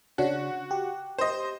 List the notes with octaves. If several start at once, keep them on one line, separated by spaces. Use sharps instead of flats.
C#3 D4 F#4 C#5
G4
C5 D#5